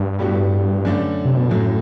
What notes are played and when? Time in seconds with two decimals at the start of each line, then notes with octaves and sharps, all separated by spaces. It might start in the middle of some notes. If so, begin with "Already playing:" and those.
Already playing: G2
0.19 A2 G3 B3 F#4
0.85 F#2 D3 A3 D4
1.25 C3
1.37 B2
1.49 F#2 A2 F#3 A3